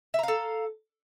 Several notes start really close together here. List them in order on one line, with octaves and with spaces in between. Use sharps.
E5 A#5 F5 A4